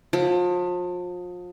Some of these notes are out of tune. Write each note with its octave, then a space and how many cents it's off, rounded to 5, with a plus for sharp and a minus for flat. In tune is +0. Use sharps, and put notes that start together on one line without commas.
F3 +35